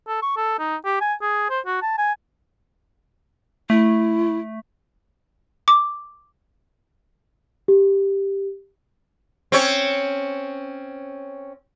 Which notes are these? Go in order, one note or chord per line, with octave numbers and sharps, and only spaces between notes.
A4
C#6
A4
D#4
G4
G#5
G#4
C5
F#4
A5
G#5
A3 E4
D6
G4
C4 C#4 C#5